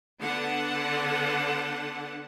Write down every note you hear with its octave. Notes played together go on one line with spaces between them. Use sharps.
D3 B3 D4 F#5 A5